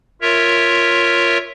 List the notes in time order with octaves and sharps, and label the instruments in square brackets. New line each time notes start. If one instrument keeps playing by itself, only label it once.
[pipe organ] F4 A#4 C#5 E5